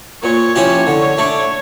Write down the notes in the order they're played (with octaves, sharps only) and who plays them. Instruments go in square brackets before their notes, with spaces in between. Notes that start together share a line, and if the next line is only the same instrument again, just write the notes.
[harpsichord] A#2 [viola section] C#5
[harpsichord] F3 C#4 E4 G4
D3
A3 D4